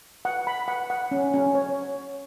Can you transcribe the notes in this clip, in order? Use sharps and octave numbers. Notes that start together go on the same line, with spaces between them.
F#5
B5
F#5
F#5
C#4
C#4
C#5